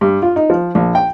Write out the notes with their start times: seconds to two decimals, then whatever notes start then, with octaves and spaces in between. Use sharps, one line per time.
0.01 G2
0.22 F4
0.36 D#4
0.50 F3
0.75 A#1
0.95 G5